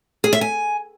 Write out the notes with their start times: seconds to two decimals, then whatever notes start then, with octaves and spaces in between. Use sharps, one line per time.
0.24 G#4
0.33 E5
0.41 G#5